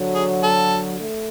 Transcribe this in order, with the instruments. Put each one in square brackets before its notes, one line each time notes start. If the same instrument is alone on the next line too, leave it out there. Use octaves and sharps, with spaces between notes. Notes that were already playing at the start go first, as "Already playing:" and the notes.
Already playing: [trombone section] D3 F#3
[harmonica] G#4
A4
[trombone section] A3